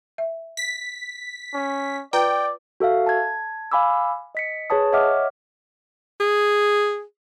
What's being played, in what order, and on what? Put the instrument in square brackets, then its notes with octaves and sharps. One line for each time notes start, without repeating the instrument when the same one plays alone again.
[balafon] E5
[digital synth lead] B6
[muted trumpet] C#4
[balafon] F4 B4 A#5 [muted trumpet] D5 [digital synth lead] G5
[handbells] F#4 A4 E5 F5
A5 G#6
F5 G#5 B5 D6 E6
D#5 B6 C#7
G#4 B4 C#5 A5 D#6
C#5 D#5 E5 F#5 D6 F6
[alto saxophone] G#4